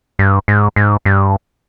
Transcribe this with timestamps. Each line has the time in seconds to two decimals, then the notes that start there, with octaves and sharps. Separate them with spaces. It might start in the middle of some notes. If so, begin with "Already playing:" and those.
0.19 G2
0.48 G#2
0.76 G#2
1.05 G2